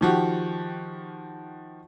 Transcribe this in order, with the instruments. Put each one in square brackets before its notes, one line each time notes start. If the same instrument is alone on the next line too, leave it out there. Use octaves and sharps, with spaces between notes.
[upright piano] D#3 F3 F#4 G4